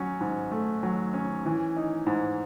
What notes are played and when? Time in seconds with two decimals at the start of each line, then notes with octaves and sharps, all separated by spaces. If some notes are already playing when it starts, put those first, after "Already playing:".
Already playing: F#3 C#4
0.20 G#2
0.51 A3
0.83 F#3
1.13 C#4
1.45 E3
1.76 D#4
2.07 G#2